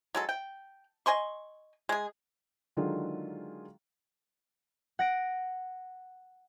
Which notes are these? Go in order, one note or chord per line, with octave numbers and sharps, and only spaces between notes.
F#3 G#3 A4
G5
D#5 G#5 C6 C#6
G#3 G#4
D3 D#3 F#3 G#3 F4 G#4
F#5 A#6 D7